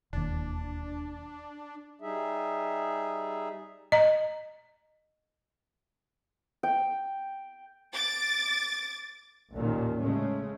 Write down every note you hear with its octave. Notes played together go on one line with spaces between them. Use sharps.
E1 D#2 D4
G3 D#4 G#4 E5
D#5 A#5
G5
D6 A6
A1 D#2 A#2 D#3
C#3 G#3 A3 C#4